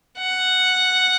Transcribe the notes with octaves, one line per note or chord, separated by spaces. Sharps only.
F#5